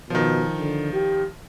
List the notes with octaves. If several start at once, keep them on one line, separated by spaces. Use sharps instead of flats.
B2 D#3 F3
D3
G4